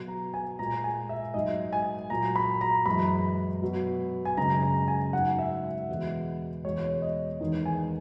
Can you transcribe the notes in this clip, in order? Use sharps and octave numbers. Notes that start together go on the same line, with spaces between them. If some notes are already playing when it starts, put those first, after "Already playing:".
Already playing: B2 F#3
A#5
G#5
A#2 G#3 A#5
G#5
E5
G#2 F#3 D#5
G#5
A#2 F#3 A#5
B5
A#5
F#2 E3 G#3 B5
B2 F#3
G#5
F#2 C#3 G#3 A#5
A#5
G#5
G#2 F#3 F#5
E5
E2 B2 G#3
E2 B2 G#3 C#5
D#5
E2 D#3 G#3
G#5